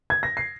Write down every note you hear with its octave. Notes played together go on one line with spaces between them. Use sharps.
G#6
A#6
C7